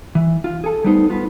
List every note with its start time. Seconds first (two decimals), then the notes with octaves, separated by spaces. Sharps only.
0.15 E3
0.44 F4
0.64 G#4 A4
0.84 G3 A3 B3 D#4 C5
1.10 B3 F4 B4